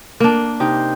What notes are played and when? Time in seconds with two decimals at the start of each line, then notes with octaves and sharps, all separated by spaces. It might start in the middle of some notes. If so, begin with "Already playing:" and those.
0.20 A#3 D4
0.60 C3 D#4 G5